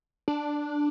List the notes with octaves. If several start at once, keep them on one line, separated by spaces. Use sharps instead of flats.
D4